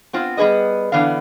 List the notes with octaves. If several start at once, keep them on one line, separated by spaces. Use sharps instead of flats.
B3 C4 F4
G3 B3 G#4 B4 D#5
D3 E3 B3 D5 F5